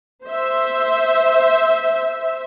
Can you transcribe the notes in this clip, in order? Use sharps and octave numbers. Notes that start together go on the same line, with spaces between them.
C5 E5